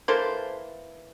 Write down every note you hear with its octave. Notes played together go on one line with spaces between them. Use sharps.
E3 A#3 A4 C5